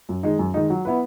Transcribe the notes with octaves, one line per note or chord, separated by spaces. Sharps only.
F#2
D#3 G#3 D#4
F#2
D#3 G#3 D#4
F#3
B3 E4 B4